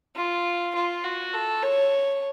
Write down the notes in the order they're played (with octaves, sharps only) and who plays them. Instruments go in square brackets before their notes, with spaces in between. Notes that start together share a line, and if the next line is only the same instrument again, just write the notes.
[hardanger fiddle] F4
F4
F#4
A4
C#5